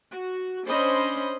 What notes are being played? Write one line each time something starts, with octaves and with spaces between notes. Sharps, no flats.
F#4
C#4 D4 C5 D#5 B5 C6